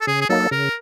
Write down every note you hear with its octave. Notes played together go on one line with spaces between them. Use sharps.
A4
C#3 G#4
G#4
F#3 A#3 D#4 A4
C#3 A#4